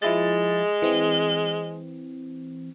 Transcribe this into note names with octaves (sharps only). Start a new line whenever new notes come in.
F3 G#3 E4 A6
E3 C4